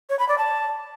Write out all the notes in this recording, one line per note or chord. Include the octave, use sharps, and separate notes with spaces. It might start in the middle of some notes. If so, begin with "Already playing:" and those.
C#5
B5
D5
A5